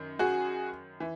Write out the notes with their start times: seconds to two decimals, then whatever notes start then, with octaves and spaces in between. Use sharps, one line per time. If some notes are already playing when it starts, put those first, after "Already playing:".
Already playing: F#2 D#3
0.19 F#4 G#4
1.00 E3